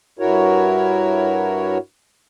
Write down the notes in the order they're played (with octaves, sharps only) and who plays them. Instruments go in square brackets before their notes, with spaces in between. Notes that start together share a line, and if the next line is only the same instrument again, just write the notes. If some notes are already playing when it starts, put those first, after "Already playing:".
[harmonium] G2 E4 F#4 A#4 C#5